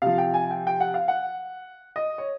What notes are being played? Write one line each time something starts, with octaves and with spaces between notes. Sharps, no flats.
C3 F3 F5
G5
G#5
G5
G5
F#5
F5
F#5
D#5
C#5